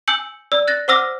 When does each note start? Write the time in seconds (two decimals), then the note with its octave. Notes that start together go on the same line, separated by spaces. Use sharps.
0.08 G#5 E6 G6 C#7 F#7
0.52 D5 E6
0.68 F#6 A6 A#6
0.88 C5 F#5 D6 E6 F6 A#6